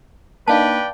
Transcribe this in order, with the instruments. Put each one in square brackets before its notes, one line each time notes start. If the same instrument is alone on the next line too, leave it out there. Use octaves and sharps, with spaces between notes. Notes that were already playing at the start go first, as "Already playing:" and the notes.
[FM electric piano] A#3 D4 D#4 [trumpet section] B4 D5 G5 [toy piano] F5 A5